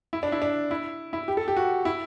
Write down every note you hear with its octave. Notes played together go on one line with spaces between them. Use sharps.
E4
D4
E4
D4
E4
E4
G4
A4
G4
F#4
E4